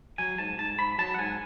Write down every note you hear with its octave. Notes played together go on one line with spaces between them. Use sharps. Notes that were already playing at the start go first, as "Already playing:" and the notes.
F#3 G#5
G#2 A5
G#2 A5
G#2 B5
F#3 A5
F#5
G#2 G#5